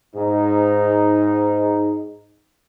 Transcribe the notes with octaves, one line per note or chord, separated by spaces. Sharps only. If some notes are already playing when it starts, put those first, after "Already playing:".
G#2 D#4